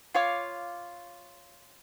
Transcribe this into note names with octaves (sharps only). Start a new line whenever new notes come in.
F4 C#5 F5 D6